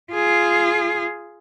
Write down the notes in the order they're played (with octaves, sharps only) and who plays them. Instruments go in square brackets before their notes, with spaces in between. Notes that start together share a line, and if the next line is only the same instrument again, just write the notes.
[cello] F4 G#4